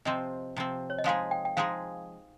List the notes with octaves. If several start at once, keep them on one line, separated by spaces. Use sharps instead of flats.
C3 F3 C4 D#5
C3 F3 C4
C#5
D#5
F3 G#3 D#4 G#4 F5
G5
G5
F3 G#3 D#4 G#4 F5